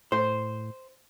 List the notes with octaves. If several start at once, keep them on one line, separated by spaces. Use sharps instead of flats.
A2 C5